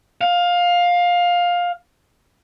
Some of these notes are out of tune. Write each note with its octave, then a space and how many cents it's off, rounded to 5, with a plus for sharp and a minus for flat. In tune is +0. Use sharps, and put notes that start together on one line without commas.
F5 +15